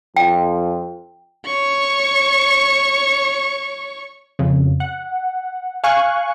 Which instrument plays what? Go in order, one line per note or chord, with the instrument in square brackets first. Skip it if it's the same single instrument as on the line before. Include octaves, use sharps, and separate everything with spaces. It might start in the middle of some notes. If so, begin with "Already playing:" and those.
[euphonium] F2 [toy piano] G5
[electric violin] C#5 C#6
[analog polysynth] F2 C#3
F#5
F5 G#5 C#6 F#6